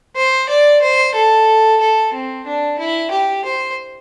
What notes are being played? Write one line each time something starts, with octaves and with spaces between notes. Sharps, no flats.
C5
D5
C5
A4
A4
C4
D4
E4
G4
C5